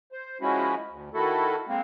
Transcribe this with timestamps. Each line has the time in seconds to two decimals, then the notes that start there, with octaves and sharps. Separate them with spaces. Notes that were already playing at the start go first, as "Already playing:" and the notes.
0.12 C5
0.41 F3 G#3 C#4 E4 F#4
0.90 D2
1.14 D#3 E4 F#4 A4
1.68 G#3 A#3 C4